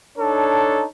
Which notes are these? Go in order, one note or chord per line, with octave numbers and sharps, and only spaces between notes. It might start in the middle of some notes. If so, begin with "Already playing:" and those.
D4 D#4 A4 C#5